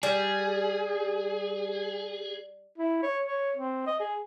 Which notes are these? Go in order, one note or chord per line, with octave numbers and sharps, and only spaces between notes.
G3 G#4
E4
C#5
C#5
C4
D#5
G#4